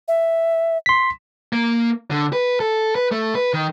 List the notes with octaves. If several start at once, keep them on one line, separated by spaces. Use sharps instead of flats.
E5
C6 B6
A#3
D3
B4
A4
B4
A3
B4
D#3